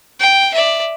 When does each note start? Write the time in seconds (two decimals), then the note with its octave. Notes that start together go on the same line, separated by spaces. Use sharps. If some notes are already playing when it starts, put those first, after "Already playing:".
0.20 G5
0.54 D5 E5